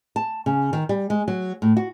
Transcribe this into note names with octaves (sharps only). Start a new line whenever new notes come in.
A5
C#3
D#3
G3
G#3
F#3
A2
F#4